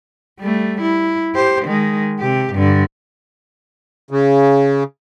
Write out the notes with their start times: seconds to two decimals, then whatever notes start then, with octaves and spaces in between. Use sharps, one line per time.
0.40 G3 A3
0.81 E4
1.35 G4 C5
1.66 D#3 G#3
2.20 C3 G4
2.54 G2 D3
4.11 C#3